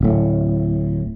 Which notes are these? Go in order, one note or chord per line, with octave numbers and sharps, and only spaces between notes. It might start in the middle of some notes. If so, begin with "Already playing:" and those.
D1 A2